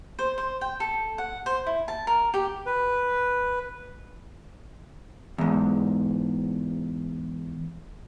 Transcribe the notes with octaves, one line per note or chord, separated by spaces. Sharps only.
C5
C5
G5
A4
F#5
C5
E4
A5
A#4
G4
B4
E2 G#2